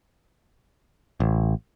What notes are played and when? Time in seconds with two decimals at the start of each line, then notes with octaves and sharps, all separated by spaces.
1.20 A1